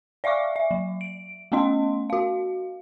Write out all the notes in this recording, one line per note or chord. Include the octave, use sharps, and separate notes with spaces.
D5 E5 F5 C#6 D6
E5
F#3
D7
A3 B3 C#4 D#5 C6
F#4 F5